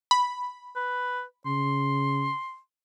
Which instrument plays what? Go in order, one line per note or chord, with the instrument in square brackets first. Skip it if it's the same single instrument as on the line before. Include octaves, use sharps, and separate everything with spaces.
[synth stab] B5
[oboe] B4
[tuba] C#3 [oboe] C6